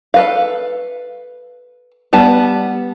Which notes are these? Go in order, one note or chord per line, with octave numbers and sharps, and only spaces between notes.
A4 B4 F5
G3 B3 A5